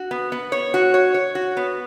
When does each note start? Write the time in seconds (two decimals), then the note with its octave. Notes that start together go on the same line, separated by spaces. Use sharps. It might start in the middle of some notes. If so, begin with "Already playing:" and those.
Already playing: F#4
0.11 B3
0.32 B3
0.52 C#5
0.74 F#4
0.94 C#5
1.14 C#5
1.35 F#4
1.57 B3